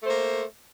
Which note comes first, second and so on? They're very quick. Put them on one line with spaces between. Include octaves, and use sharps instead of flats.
A3 C5 A#3